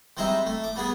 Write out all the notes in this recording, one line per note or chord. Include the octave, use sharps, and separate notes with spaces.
G3 G#3 C4 D#4 E5
A3
D6
G3 B3 G#4